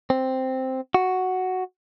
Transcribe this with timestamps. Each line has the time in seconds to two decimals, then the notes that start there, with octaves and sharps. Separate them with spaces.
0.10 C4
0.94 F#4